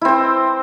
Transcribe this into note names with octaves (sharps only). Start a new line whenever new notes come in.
C4 E4 C5